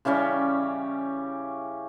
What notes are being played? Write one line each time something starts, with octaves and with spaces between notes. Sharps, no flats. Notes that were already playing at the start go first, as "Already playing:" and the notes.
C#3 E3 G3 C#4